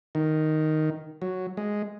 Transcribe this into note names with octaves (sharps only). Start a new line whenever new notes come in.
D#3
F#3
G#3